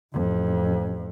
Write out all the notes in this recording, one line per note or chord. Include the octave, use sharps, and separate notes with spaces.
A1 F2